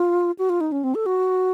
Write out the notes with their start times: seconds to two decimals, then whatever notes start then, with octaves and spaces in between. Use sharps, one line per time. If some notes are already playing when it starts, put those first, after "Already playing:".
Already playing: F4
0.39 F#4
0.50 F4
0.61 D#4
0.72 C#4
0.84 C4
0.95 A4
1.06 F#4